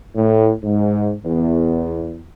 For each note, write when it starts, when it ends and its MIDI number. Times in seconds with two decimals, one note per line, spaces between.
0.15 0.51 45
0.64 1.13 44
1.24 2.23 40